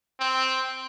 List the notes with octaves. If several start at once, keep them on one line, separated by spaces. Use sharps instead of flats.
C4